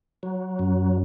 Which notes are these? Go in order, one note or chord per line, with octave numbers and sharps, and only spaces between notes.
F#3
F#2